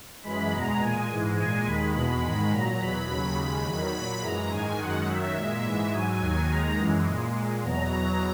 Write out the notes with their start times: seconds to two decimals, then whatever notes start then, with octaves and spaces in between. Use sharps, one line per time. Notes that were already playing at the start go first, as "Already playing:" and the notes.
0.23 F#2 E3 G#3 B5
0.52 E2 B2 G#3 A#5
0.80 A#2 G#3 G#5
1.09 G#2 E3 G#3
1.37 A#2 G#3 G#5
1.65 D#2 D#3 G#3 B5
1.94 E2 B2 G#3
2.22 G#2 D#3 G#3
2.51 A#2 F#3 A#5
2.79 E2 B2 F#3 B5
3.07 D#2 C#3 F#3
3.36 D#2 C#3 G#3 B5
3.64 E2 D#3 F#3
3.93 A#2 F#3 B5
4.21 F#2 E3 G#3 A#5
4.50 G#2 D#3 G#3 G#5
4.78 F#2 D#3 G#3 F#5
5.06 F#2 D#3 F#3 E5
5.35 A#2 G#3 E5
5.63 G#2 E3 G#3 E5
5.92 G#2 F#3 G#5
6.20 D#2 D#3 F#3
6.48 D#2 D#3 G#3 A#5
6.77 F#2 E3 G#3
7.05 A#2 G#3
7.33 A#2 G#3
7.62 E2 B2 F#3 A#5
7.90 E2 B2 F#3 A#5